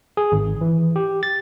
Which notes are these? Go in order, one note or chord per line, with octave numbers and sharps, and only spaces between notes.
G#4
G#1
E3
G4
A6